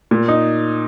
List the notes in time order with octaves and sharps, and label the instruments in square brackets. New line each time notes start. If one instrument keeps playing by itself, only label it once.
[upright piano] A#2
D#4